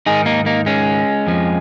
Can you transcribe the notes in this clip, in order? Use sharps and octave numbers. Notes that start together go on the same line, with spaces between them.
G#2 D#3 D#4 G#4
A#3 D#4
A#3 D#4
G#3 C#4
F2 F3